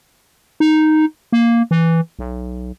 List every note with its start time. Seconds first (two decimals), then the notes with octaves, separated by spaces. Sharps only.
0.60 D#4
1.33 A#3
1.71 E3
2.19 B1